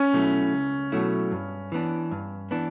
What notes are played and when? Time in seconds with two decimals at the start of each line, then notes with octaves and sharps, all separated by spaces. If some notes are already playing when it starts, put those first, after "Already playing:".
Already playing: C#4
0.13 B2 F#3 A3 E4
0.53 C#2
0.92 B2 F#3 A3 E4
1.32 G2
1.72 E3 B3 D4
2.11 G2
2.51 E3 B3 D4